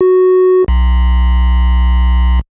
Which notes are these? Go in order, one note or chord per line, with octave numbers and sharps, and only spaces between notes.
F#4
B1